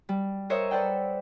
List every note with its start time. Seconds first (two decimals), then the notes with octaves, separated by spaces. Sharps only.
0.09 G3
0.50 A#4 C5 C#5 D#5 E5
0.71 A4 B4 C5 D5 F#5 G5